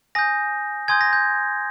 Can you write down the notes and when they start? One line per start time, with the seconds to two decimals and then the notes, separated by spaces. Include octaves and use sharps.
0.15 G#5 D#6 G6 A#6
0.88 G#5 C6 D#6 G6 G#6
1.01 A#6
1.13 G6